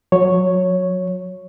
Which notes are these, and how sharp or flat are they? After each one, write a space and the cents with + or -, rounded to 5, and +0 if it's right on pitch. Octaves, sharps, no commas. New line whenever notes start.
F#3 -30 C#5 +0